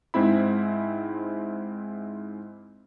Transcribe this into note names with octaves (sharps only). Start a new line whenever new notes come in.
G#2 G#3 C4 E4 B5